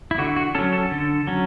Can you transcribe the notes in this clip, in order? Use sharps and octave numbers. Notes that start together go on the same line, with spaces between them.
E4
D3 F#4
F#4
F#3 C#4 A4
A4
D3
F#3 C#4